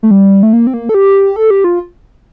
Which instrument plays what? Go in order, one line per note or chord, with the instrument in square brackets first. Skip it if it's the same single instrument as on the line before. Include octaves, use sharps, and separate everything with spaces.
[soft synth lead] A3
G3
A3
A#3
C4
A#3
A4
G4
A4
G4
F4